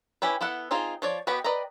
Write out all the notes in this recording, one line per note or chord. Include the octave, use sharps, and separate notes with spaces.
C#4 E4 G4 B4
B3 E4 A4 F#5
C4 D#4 F4 G#4
F3 C#5 D5
B3 F#4 G4 B4 D#5
B4 D5 D#5 G5 A#5